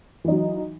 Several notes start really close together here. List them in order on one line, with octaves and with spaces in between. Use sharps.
E3 D#4 F#3